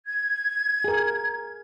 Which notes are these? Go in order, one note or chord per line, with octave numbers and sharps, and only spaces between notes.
G#6
G#4 A#4